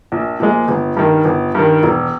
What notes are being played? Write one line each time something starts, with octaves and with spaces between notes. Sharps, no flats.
A#1
A#2 F3 G#3
G1
G2 D#3
G1
G2 D#3
E1